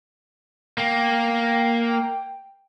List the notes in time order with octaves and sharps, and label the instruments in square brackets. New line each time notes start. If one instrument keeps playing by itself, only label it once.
[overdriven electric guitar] A#3 [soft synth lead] G5